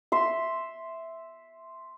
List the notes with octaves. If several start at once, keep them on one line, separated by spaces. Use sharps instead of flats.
E5 C6